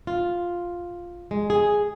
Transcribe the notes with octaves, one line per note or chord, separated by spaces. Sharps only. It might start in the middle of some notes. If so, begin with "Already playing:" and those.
F4
G#3
G#4